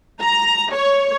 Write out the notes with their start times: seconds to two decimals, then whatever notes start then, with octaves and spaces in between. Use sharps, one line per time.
0.22 A#5
0.74 C#5